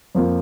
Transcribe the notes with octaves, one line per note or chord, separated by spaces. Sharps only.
F2 F3 A#3